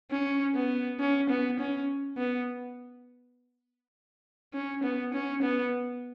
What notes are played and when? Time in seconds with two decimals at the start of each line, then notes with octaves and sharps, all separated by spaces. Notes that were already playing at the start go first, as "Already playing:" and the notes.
0.11 C#4
0.55 B3
1.00 C#4
1.29 B3
1.60 C#4
2.18 B3
4.54 C#4
4.84 B3
5.14 C#4
5.43 B3